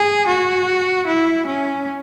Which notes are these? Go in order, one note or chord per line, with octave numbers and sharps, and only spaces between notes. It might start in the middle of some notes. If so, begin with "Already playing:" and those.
Already playing: G#4
F#4
E4
C#4